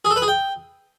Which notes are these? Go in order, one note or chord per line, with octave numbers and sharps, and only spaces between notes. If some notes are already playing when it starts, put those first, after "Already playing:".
G#4
A4
B4
G#4
G5